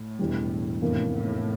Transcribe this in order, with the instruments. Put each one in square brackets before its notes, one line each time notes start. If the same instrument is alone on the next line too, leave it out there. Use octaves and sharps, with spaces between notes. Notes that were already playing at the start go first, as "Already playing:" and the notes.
Already playing: [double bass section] A2
[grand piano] E1 E2 E3 G3
[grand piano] F1 E2 E3 A#3 D4 [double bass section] A2
[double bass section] A2